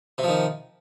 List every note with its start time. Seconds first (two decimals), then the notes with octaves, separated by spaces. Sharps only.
0.18 C3
0.23 F3
0.28 D#3